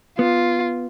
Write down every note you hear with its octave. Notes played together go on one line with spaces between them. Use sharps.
B3 F4